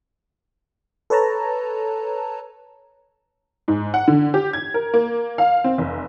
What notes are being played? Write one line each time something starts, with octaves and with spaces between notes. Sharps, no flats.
A4 B4 C#5 A5 A#5
G#2
F#5
D3
G4
G#6
A#4
A#3
F5
C4
F1